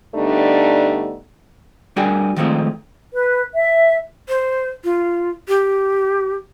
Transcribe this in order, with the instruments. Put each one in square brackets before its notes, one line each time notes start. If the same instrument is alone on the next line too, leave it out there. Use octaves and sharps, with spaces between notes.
[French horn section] D3 G3 A3 B3 D4 D#4
[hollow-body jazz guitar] G3 D4 F#4 G#4 A#4 G5
D#3 F3 G#3 A3 C4 F4
[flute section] B4
E5
[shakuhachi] C5
F4
G4